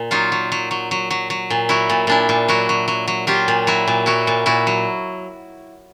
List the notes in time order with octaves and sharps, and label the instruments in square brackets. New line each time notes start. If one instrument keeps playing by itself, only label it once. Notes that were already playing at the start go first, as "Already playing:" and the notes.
Already playing: [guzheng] A#2
F#3 D#4 F4
F#3
F#3
F#3
F#3
F#3
F#3
A#2
F#3 E4 F#4
A#2
A#2 D4 E4
A#2
F#3 E4 F#4
F#3
F#3
F#3
F#3 F4 G4
A#2
F#3 E4 F#4
A#2
F#3 E4 F#4
A#2
A#2 E4 F#4
F#3